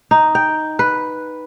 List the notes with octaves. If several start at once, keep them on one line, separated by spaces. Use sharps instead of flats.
D#4
G5
B4